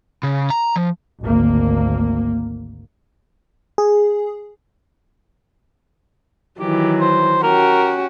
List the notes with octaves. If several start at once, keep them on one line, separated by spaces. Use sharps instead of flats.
C#3
A#5
F3
G#1 D2 A#3
G#4
D#3 E3 F#3 G4
C5
C#4 F#4 G4 A#4